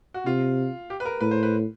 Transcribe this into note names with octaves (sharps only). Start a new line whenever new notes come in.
F#4
C3 F4
G4
B4
A#4
A2 B4
C5
B4